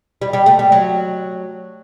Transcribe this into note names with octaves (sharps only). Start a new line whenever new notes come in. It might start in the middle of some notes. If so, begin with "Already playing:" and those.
G3
G3
A3
G3
F#3